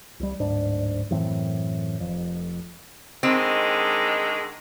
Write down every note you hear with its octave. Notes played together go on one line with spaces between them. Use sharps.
C2 G3
D1 G#2 D4
F#2 A2 E3 C4
F1 F2
D3 D#3 G#3 C4